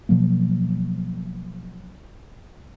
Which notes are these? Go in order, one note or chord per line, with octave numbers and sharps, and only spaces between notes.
B2 F3 F#3 A#3